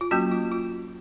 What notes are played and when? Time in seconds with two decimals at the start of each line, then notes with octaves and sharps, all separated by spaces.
0.01 F4
0.11 F#3 A#3 C#4 F#4
0.32 F4
0.51 F4